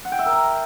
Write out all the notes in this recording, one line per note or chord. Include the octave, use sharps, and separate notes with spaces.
F#5
G5
E5
A#4
A#5